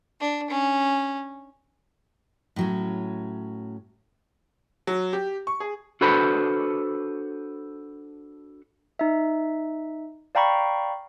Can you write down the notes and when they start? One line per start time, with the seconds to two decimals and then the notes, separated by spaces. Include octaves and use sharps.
0.21 D4
0.50 C#4
2.56 A2 F#3 C#4
4.87 F#3
5.13 G4
5.47 C#6
5.60 G#4
6.01 D4 F#4 A4 B4 C5 B5
8.99 D#4 E5
10.35 D5 F5 G5 A#5 B5 C#6